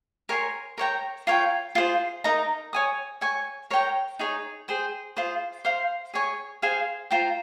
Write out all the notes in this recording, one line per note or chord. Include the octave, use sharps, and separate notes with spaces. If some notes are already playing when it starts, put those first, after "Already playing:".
A#4 C#5 G#5 C6
A#4 C#5 G5 A#5
F4 A#4 C#5 G5
F4 G#4 C5
D#4 A#4 D#5 A#5
C#5 G#5 D#6
C#5 G#5 C#6
A#4 C#5 G5 A#5
D#4 G#4 C#5
G#4 C5 G5
F4 G#4 C5
C5 F5 C6
G#4 C#5 G#5 C#6
G#4 C5 F5 G#5
F4 C5 G5 A#5